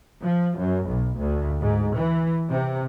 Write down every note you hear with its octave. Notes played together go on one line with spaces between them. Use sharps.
F3
F#2
B1
D2
G#2
E3
C3